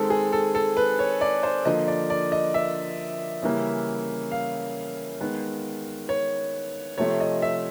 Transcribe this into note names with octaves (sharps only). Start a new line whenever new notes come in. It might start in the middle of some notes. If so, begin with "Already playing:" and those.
Already playing: D#3 G#3 C4 A4
G#4
A4
A4
B4
C#5
D5
C5
D3 F3 A#3 D#5
D5
D5
D#5
E5
C#3 E3 G3 A#3 C#4
F5
D#3 G#3 B3
C#5
C3 F3 A3 C#5
D#5
E5